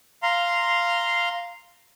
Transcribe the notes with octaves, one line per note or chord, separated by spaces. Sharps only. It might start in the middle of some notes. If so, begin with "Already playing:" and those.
F5 A#5 C6